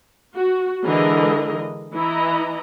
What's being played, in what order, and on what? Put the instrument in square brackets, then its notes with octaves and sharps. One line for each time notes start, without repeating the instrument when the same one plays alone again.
[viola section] F#4
D3 E3 G#3 A#4 D#5
E3 E4 D#5 A#5